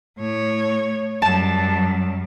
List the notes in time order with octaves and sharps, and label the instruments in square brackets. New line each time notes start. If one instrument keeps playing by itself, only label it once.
[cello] A2 C#5
[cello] F#2 G3 [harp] A5 E7